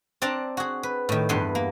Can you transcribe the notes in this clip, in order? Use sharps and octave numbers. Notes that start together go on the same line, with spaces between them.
C4 D4 D5 A5 A#5
F#4 G#4
B4
A2 D#3
E2 G2 B3 G4 G#5 C6
A#3